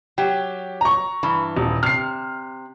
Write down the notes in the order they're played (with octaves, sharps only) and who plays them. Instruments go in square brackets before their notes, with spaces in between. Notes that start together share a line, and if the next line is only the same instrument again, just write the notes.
[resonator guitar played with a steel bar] F#3 [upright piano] G4
[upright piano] A#5 C#6
[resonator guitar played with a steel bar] G2 E3
[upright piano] D#1
[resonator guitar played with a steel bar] C3 [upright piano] F6 C7